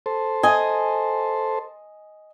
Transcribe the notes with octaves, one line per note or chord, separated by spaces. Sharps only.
A4 C5
D#5 G#5